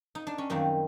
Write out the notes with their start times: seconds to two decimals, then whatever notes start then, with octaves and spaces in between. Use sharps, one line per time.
0.15 D#4
0.27 D4
0.38 C#4
0.50 F#2 D#3 G3 A#3 C4